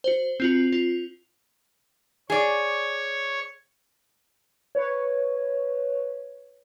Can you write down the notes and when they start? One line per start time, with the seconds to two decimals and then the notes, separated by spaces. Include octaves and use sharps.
0.04 F#4 C5
0.40 C4 F4 F#4
0.72 F4
2.30 G#4 C#5 D5
4.75 B4 C#5